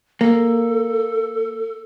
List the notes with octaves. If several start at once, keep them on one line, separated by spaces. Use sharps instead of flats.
A#3 A4